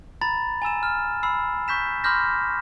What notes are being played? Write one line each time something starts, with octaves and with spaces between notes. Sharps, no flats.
A#5 B5 A6
G#5 A#5 E6 E7
F6
B5 E6 C7
C#6 G6 B6 E7
B5 C6 D6 F6 G6 A#6